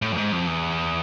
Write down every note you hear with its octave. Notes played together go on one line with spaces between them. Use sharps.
A2
F2
G#2
F2
E2